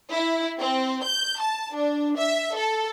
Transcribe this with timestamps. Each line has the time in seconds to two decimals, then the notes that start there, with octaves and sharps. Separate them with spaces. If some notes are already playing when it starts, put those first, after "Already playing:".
0.12 E4
0.59 C4
1.05 G6
1.41 A5
1.75 D4
2.18 E5
2.55 A4